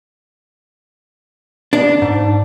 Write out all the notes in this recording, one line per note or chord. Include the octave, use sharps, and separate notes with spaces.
D4
G#2